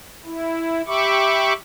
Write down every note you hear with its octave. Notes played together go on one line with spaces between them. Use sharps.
E4
G4 E5 B5 C#6 D6